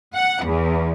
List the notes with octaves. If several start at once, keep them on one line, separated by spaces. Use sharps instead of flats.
F#5
E2